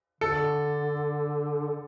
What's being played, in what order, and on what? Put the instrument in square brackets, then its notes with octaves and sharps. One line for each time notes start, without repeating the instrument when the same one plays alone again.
[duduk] D3 [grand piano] A4